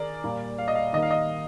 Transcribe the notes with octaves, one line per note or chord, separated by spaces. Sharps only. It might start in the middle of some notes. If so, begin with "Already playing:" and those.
Already playing: D#3 G#4 A#4 D5
A#2 G3 A#3
F5
D#5
F5
D#3 G3 A#3 D#5
F5
D#5